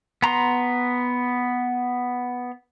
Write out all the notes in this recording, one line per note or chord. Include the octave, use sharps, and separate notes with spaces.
B3 A#5 C6